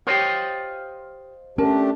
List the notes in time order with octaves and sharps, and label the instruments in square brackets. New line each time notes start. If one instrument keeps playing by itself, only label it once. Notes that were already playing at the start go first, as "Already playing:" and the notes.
[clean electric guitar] F4 C5 D#5 [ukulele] G4 C#5
[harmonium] A3 D4 G4 [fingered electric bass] C#4 [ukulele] A#4 A5